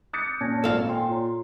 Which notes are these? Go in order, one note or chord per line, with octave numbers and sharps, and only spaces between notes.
D6 D#6 F#6 G6 A6 C#7
A#2 C#4 A5 G#6 A#6
G#1 F4 A4 D5 F5
G5 G#5 C6
F4 C#5 A#5